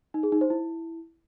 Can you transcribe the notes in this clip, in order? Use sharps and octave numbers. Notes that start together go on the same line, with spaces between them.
D#4
G#4
D#4
C5
E4